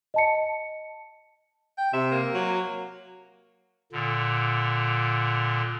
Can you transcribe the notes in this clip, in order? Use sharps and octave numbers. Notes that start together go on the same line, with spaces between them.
D#5 A5 C#7
G5
C3 E5
A#3
F#3
A#2 D3